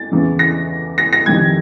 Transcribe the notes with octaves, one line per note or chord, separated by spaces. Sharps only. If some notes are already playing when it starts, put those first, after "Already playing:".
Already playing: A6
E2 C#3 E3
A#6
A#6
A#6
F2 C3 D#3 G#6